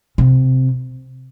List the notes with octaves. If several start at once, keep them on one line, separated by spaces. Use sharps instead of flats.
C3